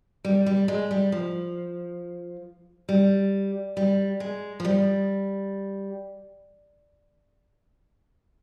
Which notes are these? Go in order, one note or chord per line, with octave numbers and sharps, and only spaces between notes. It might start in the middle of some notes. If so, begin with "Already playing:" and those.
G3
G3
G#3
G3
F3
G3
G3
G#3
F3
G3